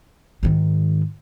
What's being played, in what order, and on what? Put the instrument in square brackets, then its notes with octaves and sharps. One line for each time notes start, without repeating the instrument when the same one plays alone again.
[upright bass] G#2 D#3